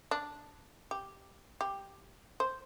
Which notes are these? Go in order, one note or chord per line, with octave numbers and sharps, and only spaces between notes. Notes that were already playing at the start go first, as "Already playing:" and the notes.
D4
G4
G4
C5